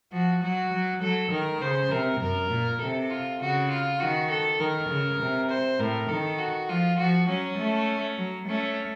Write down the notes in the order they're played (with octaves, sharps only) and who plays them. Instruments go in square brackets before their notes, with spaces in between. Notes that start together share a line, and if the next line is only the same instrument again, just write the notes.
[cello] F3 [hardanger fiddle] F#4
[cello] F#3 [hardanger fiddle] F#4
[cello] F#3
[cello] F#3 [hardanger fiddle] A4
[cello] D#3 [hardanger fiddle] A#4
[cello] C#3 [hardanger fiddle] C5
[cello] C3 [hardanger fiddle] A#4
[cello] F#2 [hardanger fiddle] A#4
[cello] A#2
[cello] C3 [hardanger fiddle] A4
[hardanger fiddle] F4
[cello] C#3 [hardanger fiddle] F#4
[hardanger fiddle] F4
[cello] D#3 [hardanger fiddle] F#4
[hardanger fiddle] A4
[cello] D#3 [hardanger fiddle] A#4
[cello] C#3
C3
[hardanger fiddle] C5
[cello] A2 [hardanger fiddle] A#4
[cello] D#3 [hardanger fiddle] A4
[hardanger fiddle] F#4
[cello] F3 [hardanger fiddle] F4
[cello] F3 [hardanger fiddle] F#4
[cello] F#3 [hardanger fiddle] C#4
[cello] A3
F#3
[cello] A3 [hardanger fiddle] C#4